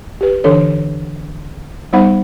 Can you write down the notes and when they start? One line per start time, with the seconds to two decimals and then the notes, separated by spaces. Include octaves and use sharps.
0.21 G4 B4
0.44 D3 E3 D4 A4 C#5
1.93 G3 B3 D#4 C5 F#5 B5